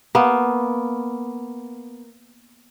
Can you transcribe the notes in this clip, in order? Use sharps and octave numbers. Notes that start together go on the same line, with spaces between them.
A#3 B3